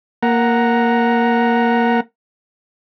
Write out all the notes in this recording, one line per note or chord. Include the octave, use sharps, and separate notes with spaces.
A#3 F#5 A#5